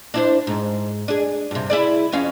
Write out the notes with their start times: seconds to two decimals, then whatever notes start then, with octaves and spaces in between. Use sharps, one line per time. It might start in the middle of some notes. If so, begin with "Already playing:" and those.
0.14 D4 E4 C5
0.47 G#2
1.08 D4 G#4
1.51 G2 C3
1.70 E4 G#4 D5
2.12 F2 C#4 F5